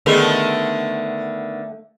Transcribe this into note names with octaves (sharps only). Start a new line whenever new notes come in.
D3 D#3 A3 B3 G#4 A4 D#5